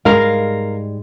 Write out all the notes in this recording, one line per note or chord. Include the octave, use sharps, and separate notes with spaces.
G#2 G3 G#3 A#4 F5